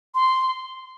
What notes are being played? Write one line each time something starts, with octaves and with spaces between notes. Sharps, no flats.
C6